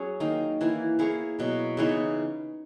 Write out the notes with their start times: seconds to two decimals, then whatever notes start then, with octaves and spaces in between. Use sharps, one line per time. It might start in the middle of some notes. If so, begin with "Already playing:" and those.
Already playing: F#3 C#4 G#4
0.20 D#3 A#3 D#4
0.61 E3 A#3 E4
0.99 A#3 E4 G#4 C#5
1.39 B2 F#3 A#3
1.77 C#3 E3 B3 D#4